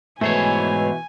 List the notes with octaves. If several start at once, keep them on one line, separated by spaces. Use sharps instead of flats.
G#2 B2 E3 A3 C5 C#5 G#5